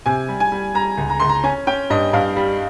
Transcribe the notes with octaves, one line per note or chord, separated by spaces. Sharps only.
C3 G#5
G3
G#5
G3
G3 A#5
C#2
A#5
C#2 C6
A#5
C#4 G#5
C#4 G5
G2 D#5
G2 F5
G3